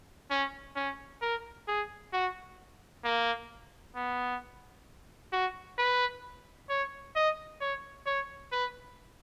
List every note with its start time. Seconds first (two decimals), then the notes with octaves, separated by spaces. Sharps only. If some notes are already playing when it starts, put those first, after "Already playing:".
0.30 C#4
0.76 C#4
1.22 A#4
1.68 G#4
2.13 F#4
3.05 A#3
3.96 B3
5.33 F#4
5.78 B4
6.69 C#5
7.15 D#5
7.61 C#5
8.06 C#5
8.52 B4